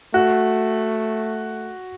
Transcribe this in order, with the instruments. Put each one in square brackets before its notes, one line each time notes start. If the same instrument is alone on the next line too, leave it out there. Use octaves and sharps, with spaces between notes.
[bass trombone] A3 [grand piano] F#4